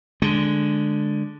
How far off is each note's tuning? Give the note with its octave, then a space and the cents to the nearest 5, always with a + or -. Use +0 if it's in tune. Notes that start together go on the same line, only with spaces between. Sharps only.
D3 +0 G#3 +0